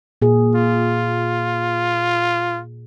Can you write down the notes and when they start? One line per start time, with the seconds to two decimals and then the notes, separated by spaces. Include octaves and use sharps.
0.22 A#2 G#4
0.55 F4